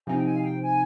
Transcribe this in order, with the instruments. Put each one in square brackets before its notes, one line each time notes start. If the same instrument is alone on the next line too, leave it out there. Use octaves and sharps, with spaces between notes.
[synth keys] C3 F3 C4 D#4 [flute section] G#5
[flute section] G5
G#5
F5
G5
G#5